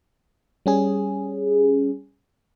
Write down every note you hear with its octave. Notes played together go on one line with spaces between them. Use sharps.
G3 C#4 G#4